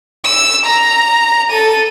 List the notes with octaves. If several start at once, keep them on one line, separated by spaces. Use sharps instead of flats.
E6
A#5
A4 D#7